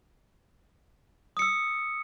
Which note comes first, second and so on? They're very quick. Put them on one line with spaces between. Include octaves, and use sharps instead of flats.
D#6 C#7 E6